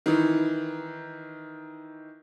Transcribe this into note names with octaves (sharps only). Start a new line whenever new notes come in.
D#3 E3